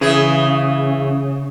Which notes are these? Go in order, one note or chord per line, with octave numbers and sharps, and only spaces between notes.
C#3 E3 G#4